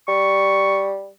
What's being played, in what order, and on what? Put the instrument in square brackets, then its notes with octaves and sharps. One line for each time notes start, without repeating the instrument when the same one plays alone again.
[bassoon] G3 [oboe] C#6